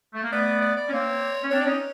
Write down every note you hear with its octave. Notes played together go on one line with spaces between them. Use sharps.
A3
A#3
A3 B3 D5
D5
D5
C#4
A#3 C4 C#5
C#4
C4 D4 C#5
D5
C#4 D#4 C#5